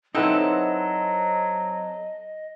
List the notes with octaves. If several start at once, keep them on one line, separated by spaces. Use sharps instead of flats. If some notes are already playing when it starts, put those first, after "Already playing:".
F#3 C4 D#4 E4 A4 B4 D#5 F#5